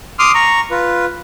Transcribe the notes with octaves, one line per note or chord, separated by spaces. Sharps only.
C6 D6 D#6 F6
A#5 C#6
F4 B4